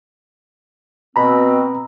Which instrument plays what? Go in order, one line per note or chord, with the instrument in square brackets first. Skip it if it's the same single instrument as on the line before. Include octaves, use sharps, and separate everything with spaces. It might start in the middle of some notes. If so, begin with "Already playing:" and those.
[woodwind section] B2 C4 [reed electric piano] A#5 B5